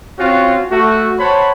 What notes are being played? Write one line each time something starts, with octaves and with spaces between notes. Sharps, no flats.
C4 C#4 F4 F#4
A3 F#4
C5 C#5 F#5 A5 B5